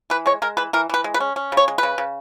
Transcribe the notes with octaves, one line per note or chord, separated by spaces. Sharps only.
E3 B4
G#3 C#5
G#3 A#4
E3 B4
E3 A#4
E3 B4
G#3
B4
C#4
C#4
C#3
C#5
G#3
C#3 B4
C#3